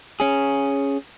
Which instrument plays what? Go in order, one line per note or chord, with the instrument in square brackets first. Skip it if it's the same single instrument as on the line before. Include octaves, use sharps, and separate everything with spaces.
[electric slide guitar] C#4 G#4